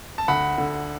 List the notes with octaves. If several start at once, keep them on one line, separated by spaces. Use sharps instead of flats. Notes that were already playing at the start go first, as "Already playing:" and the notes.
A5
D2 F#5 B5
D3